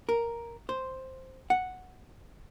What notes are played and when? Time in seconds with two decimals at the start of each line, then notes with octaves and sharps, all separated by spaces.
0.09 A#4
0.69 C5
1.50 F#5